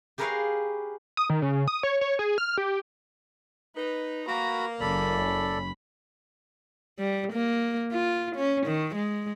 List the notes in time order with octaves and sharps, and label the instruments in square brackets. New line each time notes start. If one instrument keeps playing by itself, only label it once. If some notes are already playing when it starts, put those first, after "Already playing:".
[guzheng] G4 G#4 A#4 B4 C#5 F5
[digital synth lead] D#6
D#3
C#3
D#6
C#5
C#5
G#4
F6
G4
[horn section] D#4 [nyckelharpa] B4
[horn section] A#3 [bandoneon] F#4 B5 [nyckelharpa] A#5
[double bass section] F#1 C#4 [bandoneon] A4 D5 [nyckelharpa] B5
[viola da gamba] G3
A#3
F4
C#4
D#3
G#3